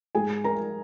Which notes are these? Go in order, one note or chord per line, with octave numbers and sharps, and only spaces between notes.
G#2 G#4 G#5
A#4 A#5